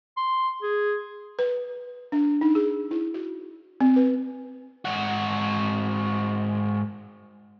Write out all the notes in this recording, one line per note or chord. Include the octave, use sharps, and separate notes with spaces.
C6
G#4
B4
D4
D#4
G#4
E4
F#4
C4
B4
G#2 F#4